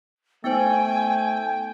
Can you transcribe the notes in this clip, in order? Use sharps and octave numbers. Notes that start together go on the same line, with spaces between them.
A3 B3 D#4 C5 G5 G#5